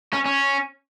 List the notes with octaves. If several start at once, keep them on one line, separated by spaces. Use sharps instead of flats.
C#4
C#4